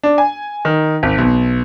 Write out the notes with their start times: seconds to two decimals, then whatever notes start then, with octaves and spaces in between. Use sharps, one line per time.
0.03 D4
0.18 G#5
0.65 D#3
1.03 G#1
1.18 B1